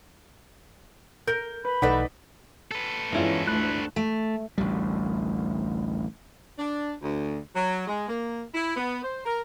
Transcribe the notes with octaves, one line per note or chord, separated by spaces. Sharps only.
A#4 G6
B4 B5
B1 E3 A3 D#4 B4 D5 F#5 B6
A4 B4
E2 G2 E3 G#3 C#4 E4 F4
D2 D4 B5 F#6
A3
A1 D2 G3
D4
D2
F#3
G#3
A#3
E4
B3
C5
A#4